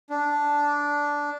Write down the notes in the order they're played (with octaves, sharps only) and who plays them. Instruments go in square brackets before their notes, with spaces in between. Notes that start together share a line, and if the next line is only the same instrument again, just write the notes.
[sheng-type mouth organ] D4